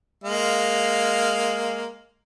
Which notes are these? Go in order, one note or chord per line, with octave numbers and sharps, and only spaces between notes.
G#3 A#3 F5